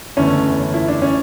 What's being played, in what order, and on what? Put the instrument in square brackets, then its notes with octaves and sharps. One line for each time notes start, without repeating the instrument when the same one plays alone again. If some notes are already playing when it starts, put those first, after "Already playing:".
[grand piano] F#1 E2 D3 A3 C#4
E4
D4
C#4